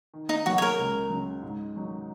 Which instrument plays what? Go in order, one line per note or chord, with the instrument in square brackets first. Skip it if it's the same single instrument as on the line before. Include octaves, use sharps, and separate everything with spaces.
[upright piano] D#3
[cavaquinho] D#4
[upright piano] F#3 A#3 [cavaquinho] F#4
[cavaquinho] C#5
A#4
[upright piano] C#2
C#3 F#3
G#2
D#3 F#3 D#4